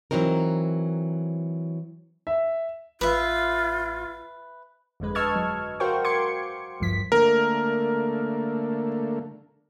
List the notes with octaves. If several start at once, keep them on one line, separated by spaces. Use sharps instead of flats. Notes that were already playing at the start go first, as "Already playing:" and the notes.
E3 F#3 C4 D#4 A#4
E5
A1 F4 B4 E5
G1 F2 D3 G#3 B4
D#5 A5 C#6 E6 F6 G#6
F#3
F#4 A#4 C5 F5 G5 C#6
C6 D6 G#6 C#7
A1 D2 G2 F3 B6
D3 A3 A#3 A#4